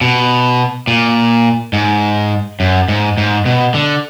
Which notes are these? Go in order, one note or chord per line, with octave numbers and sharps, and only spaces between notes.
B2
A#2
G#2
F#2
G#2
G#2
B2
D3